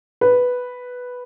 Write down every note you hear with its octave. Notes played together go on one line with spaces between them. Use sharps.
B4